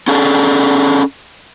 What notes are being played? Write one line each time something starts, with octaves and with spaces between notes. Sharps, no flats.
C#4 D4 G#4 A4